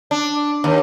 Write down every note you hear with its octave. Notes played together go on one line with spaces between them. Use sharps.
D4
D#2